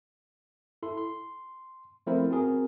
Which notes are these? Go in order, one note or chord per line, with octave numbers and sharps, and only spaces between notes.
E4 A4 C6
C6
F3 A3 C4 E4 A#4 C5
C4 F#4 G#4 A#4